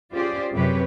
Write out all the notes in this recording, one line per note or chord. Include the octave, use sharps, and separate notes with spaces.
C#4 F4 G4 G#4 C5 D5
F#2 C3 G4 B4 C#5